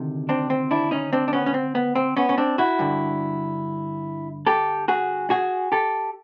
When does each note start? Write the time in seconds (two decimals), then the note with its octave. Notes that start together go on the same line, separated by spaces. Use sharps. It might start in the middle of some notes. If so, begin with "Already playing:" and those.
Already playing: D2 C3 D#3
0.29 C4 D4
0.50 C4
0.71 D4 E4
0.91 C#4 D#4
1.13 C4 D4
1.28 D4
1.33 B3 C#4
1.46 C#4
1.54 C4
1.75 B3
1.95 C4
2.17 B3 C#4
2.29 C#4
2.37 C4 D4
2.58 E4 F#4
2.79 G2 D3
4.46 G4 A4
4.88 F#4 G#4
5.30 F#4 G#4
5.72 G4 A4